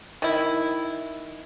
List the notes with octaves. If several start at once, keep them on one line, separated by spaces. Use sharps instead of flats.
D#3 E4